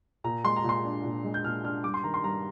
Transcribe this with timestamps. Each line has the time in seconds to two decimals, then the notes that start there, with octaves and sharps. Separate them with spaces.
0.24 A#2 A#5
0.44 G#3 C6
0.56 A#5
0.64 A#2 C6
0.85 D4
1.04 A#2
1.25 G#3
1.34 G6
1.44 A#2 F6
1.64 D4 F6
1.84 G2 D6
1.94 C6
2.04 D#3 A#5
2.14 C6
2.24 G2 A#5